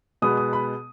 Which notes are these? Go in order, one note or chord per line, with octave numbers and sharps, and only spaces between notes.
B2 G#3 B3 D#6
D#6
B5